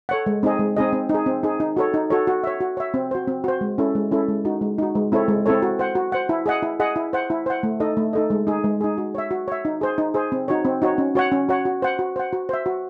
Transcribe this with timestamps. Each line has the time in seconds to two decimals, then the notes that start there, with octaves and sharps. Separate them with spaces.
0.09 A4 C#5 F#5
0.26 G#3
0.43 C4 D#4 G#4 D#5
0.59 G#3
0.77 C4 D#4 G#4 D#5
0.93 C4
1.09 D#4
1.14 G#4
1.26 C4
1.43 D#4 G#4
1.60 D#4
1.77 F#4 A4 C#5
1.94 D#4
2.10 F#4 A4 C#5
2.27 F#4
2.44 C#5 E5
2.60 F#4
2.77 C#5 E5
2.94 C4
3.11 F#4 C5
3.28 C4
3.44 F#4 C5
3.61 G#3
3.78 C#4 E4 A4
3.95 G#3
4.11 C#4 E4 A4
4.28 G#3
4.45 D#4 F#4
4.61 G#3
4.78 D#4 F#4
4.95 G#3
5.12 C4 E4 A4 C#5
5.28 G#3
5.46 C4 E4 A4 C#5
5.62 F#4
5.79 C5 F#5
5.95 F#4
6.12 C5 F#5
6.29 E4
6.46 G#4 D#5 F#5
6.63 E4
6.80 G#4 D#5 F#5
6.96 E4
7.13 C5 F#5
7.30 E4
7.46 C5 F#5
7.63 A3
7.80 D#4 A4 D#5
7.97 A3
8.13 D#4 A4 D#5
8.30 G#3
8.47 D#4 G#4
8.64 G#3
8.81 D#4 G#4
8.98 F#4
9.15 C#5 E5
9.31 F#4
9.48 C#5 E5
9.65 D#4
9.81 G#4 C5
9.98 D#4
10.14 G#4 C5
10.32 C4
10.48 D#4 F#4 C#5
10.65 C4
10.82 D#4 F#4 C#5
10.98 C#4
11.15 F#4 C#5 F#5
11.32 C#4
11.49 F#4 C#5 F#5
11.65 F#4
11.82 C5 F#5
11.99 F#4
12.16 C5 F#5
12.33 F#4
12.49 C5 E5
12.66 F#4